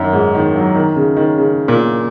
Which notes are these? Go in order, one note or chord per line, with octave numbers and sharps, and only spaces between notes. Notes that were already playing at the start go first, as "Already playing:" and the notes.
Already playing: F#2 D#3
G#2
D#3
F#3
D#3
C#3
D#3
C#3
A#2